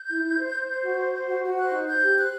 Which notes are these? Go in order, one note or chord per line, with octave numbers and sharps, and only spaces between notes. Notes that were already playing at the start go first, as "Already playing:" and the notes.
Already playing: G6
E4
E4
C5
C5
C5
F#4
C5
C5
F#4
F#4
C5 F#6
D#4
C5 G6
G4
C5 F#6